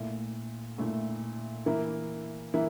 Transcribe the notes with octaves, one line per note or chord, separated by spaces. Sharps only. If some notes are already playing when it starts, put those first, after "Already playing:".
Already playing: A#2 A3 E4
A#2 A3 E4
E3 A#3 E4
E3 A#3 E4